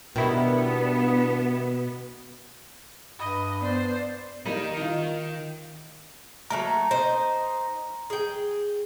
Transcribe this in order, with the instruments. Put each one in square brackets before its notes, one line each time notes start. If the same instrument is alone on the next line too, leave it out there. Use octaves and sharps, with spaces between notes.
[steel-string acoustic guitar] B2 [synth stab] D#3 E4 [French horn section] G3 D4 [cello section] B3
[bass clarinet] G2 [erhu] D#5 [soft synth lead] B5
[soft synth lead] B3 [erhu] C5 [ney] D5
[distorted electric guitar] D#3 A#5 [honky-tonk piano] G3 A#3 D#4
[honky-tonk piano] D#4 F4
[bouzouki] F#3 A3 A#3 [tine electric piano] A#5
[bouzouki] D#4 C5
G#4 G5